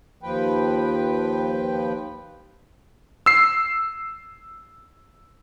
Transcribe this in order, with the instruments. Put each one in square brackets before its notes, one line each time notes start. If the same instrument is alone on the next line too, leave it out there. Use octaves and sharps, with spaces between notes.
[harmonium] D#2 F3 B4 G5
[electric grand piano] E6 C7